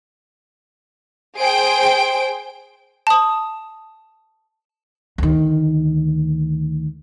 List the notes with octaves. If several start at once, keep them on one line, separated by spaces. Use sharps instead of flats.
G#4 C5 G5 D7
A5 D#6
D2 D#3